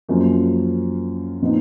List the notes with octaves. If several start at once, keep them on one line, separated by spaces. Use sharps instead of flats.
F#2 F3 A#3
A#2 F3 B3 D#4